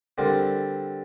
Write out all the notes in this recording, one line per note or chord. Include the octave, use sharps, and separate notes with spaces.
D3 G3 C4 G4 A#4